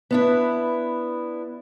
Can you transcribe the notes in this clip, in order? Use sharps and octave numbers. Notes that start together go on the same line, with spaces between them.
B3 D4 E4